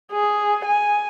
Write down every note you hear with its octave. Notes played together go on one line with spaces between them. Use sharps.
G#4
G#5